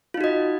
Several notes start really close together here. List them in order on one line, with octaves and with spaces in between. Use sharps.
F4 D#4 F#4 D#5